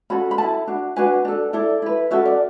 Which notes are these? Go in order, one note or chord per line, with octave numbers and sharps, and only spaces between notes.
C#4 F#4 A4 B5
B5
E4 A4 A5
D4 F#4
D4 F#4 B4 G#5
D4 A4
E4 A4 D5
E4 B4
C#4 F#4 A4 E5
D5